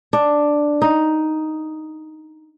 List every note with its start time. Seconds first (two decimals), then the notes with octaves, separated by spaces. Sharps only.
0.13 D4
0.82 D#4